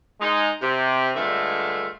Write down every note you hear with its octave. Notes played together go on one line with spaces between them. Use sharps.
G#3 D#4
C3
G2 D3 G#3 A3 F4 E5